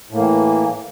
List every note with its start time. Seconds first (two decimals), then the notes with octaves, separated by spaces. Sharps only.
0.11 A2
0.15 A#3
0.18 E3